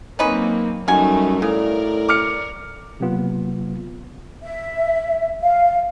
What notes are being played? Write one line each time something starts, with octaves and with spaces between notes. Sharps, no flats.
F#3 A#3 C4 C#4 D#4 B4
F#2 G3 A3 D#4 A#4 F#5 G#5
A2 C#3 A#4 D5
D6 F6 C#7
C3 F#3 A#3 B3 F4
E5
F5